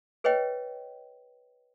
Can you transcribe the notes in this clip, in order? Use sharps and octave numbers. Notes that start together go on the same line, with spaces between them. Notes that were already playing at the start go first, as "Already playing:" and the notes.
G#4 B4 C#5 D#5 G5